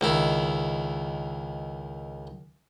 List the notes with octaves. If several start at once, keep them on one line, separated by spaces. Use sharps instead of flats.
C#2 D#3 E4